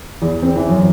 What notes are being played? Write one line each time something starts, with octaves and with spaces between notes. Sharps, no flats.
E2
C4
E3
F#2